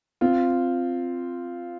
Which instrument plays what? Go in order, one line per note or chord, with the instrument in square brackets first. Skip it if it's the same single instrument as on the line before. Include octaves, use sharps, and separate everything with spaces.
[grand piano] C4 F4